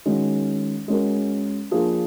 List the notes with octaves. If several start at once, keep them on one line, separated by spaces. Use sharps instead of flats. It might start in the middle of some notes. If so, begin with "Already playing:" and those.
D#3 G#3 C#4 F#4
G#3 C#4 F#4 A#4
F3 A#3 D4 F4 G#4